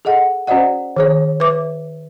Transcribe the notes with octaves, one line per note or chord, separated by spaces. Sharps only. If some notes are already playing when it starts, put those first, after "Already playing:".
G#4 A4 D#5 F#5
C#4 F#4 C5 D5 D#5 F#5
D#3 G#4 C#5
B4 E5 D6